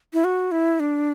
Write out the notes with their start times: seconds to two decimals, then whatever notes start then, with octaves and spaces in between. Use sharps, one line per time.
0.13 E4
0.24 F#4
0.52 E4
0.80 D4